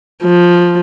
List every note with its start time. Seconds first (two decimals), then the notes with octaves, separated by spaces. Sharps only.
0.23 F3